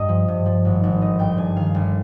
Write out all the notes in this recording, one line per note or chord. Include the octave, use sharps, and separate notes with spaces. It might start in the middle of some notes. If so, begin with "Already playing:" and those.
Already playing: G2 D#5
F3
G2
F3
G#1
G#1
G1 D#5
G1 G5
G2 G#5
D#3 F5
G1